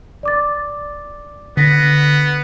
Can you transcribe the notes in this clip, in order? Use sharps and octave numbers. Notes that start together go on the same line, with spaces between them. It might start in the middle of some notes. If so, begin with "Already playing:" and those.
D5 D6 A6
D3 B3 A#6 B6